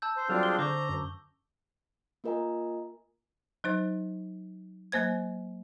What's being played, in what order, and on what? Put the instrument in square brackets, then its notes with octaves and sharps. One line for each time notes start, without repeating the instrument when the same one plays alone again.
[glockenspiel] A5 E6 G6
[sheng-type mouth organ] C5
[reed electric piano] F#3 G3 F6 [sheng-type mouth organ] C4 D4 F4 [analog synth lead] A4
[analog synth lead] G#4 [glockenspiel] G7
[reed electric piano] D3 [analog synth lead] C5 [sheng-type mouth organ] A#5 [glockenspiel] C#6 D6
[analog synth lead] F#2
[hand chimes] A#3 F4 A#4 D#5 G#5 A#5
[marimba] F#3 D#4 C5
F#3 A#3 C5 G#6